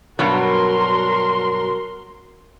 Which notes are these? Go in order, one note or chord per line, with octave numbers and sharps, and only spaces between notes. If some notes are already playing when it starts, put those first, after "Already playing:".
G2 B2 F#3 F#4 A#4 C6